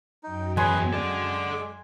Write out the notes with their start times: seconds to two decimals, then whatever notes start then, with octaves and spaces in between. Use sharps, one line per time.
0.23 F#2 F#3 D#4 G5
0.57 E2 G#4 B4 C#5 G#5 C6
0.93 G#3 A4 D5 D6